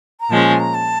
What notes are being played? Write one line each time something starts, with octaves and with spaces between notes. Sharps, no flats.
A#5
A#2 F3 G#3 C#4 A5
G#5
A#5
A5